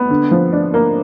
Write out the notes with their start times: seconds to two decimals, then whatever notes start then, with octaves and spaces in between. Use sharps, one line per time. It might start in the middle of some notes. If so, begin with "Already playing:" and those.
Already playing: B3
0.10 D3
0.31 F3
0.53 D4
0.74 A#3